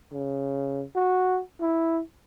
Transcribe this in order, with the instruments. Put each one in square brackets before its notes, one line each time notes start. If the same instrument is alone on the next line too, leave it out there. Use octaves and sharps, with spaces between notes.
[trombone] C#3
F#4
E4